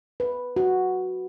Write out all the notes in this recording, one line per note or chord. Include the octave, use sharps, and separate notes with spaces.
B4
F#4